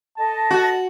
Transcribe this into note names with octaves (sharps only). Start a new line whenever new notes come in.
A4 D#5 A5
F#4